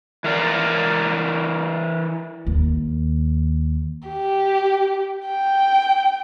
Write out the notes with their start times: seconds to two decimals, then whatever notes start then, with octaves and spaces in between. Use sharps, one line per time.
0.24 E3 A#4 D5
2.47 D#2
4.08 G4
5.27 G5